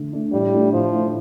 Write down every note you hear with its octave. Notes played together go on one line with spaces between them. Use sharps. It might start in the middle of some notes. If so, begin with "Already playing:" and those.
Already playing: D3 A3
A3 D4
A2 G3
A3 D4 F4
A2 F3
A3 D4 F4